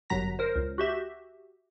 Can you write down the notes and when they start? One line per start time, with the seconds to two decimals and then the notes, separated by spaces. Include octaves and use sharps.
0.10 G1 F#2 F#3 A#5 A#6 B6
0.39 A#4 C5
0.56 C#2
0.78 F#4 G4 E5